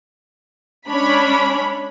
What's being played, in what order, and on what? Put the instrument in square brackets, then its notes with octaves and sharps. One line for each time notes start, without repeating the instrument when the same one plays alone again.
[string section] G#3 C#4 D4 C#5 B5